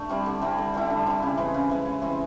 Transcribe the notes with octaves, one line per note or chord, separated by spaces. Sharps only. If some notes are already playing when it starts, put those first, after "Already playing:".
Already playing: A3 D4
G3 C4 E4
D3
G3 C4 E4
D3
G3 C4 E4
D3
G3 C4 E4
C#3
E3 G#3 C4
C#3
E3 G#3 C4
C#3
E3 G#3 C4